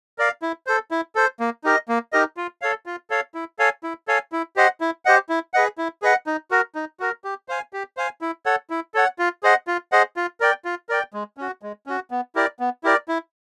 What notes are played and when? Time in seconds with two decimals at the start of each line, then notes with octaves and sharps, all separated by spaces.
0.18 A#4 D5 F5
0.42 E4
0.67 A4 C5
0.91 E4
1.15 A4 C5
1.40 A#3
1.64 D#4 G4 A#4 D#5
1.89 A#3
2.13 D#4 G4 A#4 D#5
2.37 F4
2.61 A4 C#5 F5
2.86 F4
3.10 A4 C#5 F5
3.34 E4
3.59 A4 C#5 F5 G#5
3.83 E4
4.08 A4 C#5 F5 G#5
4.32 E4
4.56 G4 C5 D#5 F#5
4.81 E4
5.05 G4 C5 D#5 F#5
5.29 E4
5.54 G#4 B4 D#5 F#5
5.78 E4
6.02 G#4 B4 D#5 F#5
6.27 D#4
6.51 F#4 A#4
6.75 D#4
7.00 F#4 A#4
7.24 G4
7.49 C5 F5 G#5
7.73 G4
7.97 C5 F5 G#5
8.21 E4
8.46 A4 C#5 F#5
8.70 E4
8.94 A4 C#5 F#5
9.19 F4
9.43 G#4 C5 D#5 F#5
9.67 F4
9.92 G#4 C5 D#5 F#5
10.16 F4
10.40 A#4 D5 G5
10.65 F4
10.89 A#4 D5 G5
11.13 G#3
11.37 C#4 F#4
11.62 G#3
11.87 C#4 F#4
12.11 B3
12.35 E4 G4 A#4 D5
12.59 B3
12.84 E4 G4 A#4 D5
13.08 E4